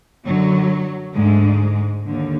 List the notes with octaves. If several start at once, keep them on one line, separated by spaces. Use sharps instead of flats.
F#2 D3 F#3
D2 G#2 D3 G#3
D#2 D3